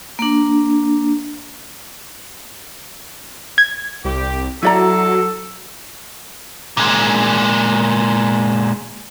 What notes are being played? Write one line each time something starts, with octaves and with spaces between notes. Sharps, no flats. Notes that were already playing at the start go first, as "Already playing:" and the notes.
A#3 D4
G#6
C2 G4
F#3 E4 A4 D5 A#5
A#2 G#3